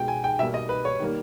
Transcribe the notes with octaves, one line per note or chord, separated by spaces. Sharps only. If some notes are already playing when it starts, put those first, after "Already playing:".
Already playing: B2 G#3 G5
G#5
G5
B2 G3 A#3 E5
D#5
B4
C#5
D#3 G3 A#3